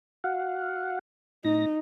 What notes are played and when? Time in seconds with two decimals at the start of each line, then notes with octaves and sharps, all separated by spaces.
0.24 F#4 F5 F#5
1.45 A2 D#4 A#6